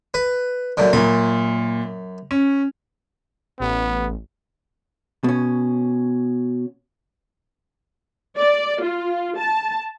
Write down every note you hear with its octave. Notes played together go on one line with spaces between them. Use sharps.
B4
F#2 A#2 D3
F#2 A#2 B5
C#4
A1 B3
B2 C#4
D5
F4
A5